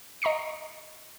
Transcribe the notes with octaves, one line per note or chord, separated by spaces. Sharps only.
D#5 A#5 C#6 C7 C#7